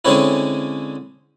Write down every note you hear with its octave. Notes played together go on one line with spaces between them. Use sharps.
D3 G#3 C4 C#4 E4